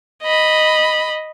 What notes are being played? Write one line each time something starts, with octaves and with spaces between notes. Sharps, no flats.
D#5 B5